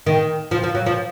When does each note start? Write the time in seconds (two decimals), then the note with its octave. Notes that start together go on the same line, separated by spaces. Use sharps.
0.06 D#3
0.51 F3
0.64 F3
0.75 F#3
0.86 F3